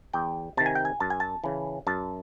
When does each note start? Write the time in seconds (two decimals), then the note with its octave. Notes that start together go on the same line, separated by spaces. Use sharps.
0.13 E2 G5
0.57 C3 D#3 A5
0.66 G#5
0.75 G5
0.85 G#5
1.00 F#2 A5
1.10 G#5
1.20 A5
1.44 C#3 E3
1.87 F#2 A5